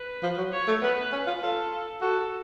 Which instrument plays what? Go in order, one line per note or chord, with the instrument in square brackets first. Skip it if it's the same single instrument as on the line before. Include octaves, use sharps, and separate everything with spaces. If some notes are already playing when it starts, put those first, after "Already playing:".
Already playing: [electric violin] B4
[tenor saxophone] F3
F#3
[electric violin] C#5
[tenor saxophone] A3
[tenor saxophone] B3 [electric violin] B4
[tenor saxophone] C#4
F4
[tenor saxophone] F4 [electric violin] A4
[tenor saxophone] F#4 [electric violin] A4